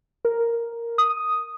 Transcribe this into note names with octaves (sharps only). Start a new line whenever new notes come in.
A#4
D#6